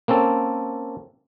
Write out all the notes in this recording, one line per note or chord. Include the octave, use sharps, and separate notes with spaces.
A#3 C4 C#4 A4